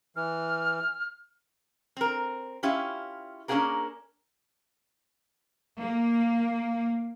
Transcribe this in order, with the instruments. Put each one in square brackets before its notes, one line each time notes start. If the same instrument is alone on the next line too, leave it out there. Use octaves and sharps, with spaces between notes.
[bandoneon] E3 [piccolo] F6
[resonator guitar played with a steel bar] C4 A#4
C#4 E4 F4 G4
A#3 C#4 D4 F#4 G#4 A#4
[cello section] A#3